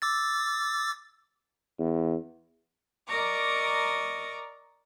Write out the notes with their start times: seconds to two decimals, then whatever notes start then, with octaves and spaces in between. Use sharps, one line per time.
0.02 D6 E6 A6
1.79 E2
3.09 A#4 D5 D#5 A#5 C#6 D6